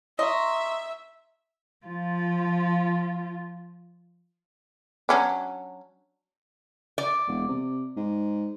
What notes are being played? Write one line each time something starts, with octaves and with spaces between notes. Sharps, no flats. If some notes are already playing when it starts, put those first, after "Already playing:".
D#5 E5 A#5 C6 C#6
F3 F4
F#3 C#4 D4
D5
E1
C3
G#2